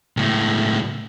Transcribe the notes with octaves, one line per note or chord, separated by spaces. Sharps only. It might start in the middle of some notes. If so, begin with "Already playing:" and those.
C#2 A2